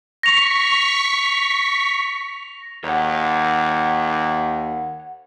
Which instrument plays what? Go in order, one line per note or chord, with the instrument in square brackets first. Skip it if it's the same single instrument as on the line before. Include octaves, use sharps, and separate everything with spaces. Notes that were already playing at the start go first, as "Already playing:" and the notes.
[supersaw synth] C#6 B6 [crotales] A#6 F7
[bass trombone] D#2 [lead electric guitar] C#5 F#5